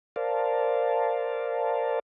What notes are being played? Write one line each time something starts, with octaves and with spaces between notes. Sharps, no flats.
A#4 C5 D5 F5 A5